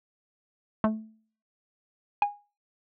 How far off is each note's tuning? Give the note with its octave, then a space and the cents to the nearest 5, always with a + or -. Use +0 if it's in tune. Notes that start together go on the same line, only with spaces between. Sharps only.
A3 -5
G#5 -20